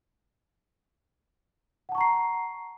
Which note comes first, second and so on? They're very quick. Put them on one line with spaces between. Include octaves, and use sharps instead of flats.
F#5 A5 C#6 A#5 C7